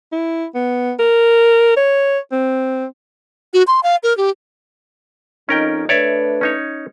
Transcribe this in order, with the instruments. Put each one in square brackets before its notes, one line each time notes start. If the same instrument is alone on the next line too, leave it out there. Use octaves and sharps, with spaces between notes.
[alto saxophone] E4
B3
A#4
C#5
C4
[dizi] F#4
C6
F5
A#4
G4
[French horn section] F2 D#4 [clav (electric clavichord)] C#4 A#4 G5
[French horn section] A3 D4 B4 [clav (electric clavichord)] C#5 D5 E5
[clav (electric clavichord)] C#4 D#4 C#5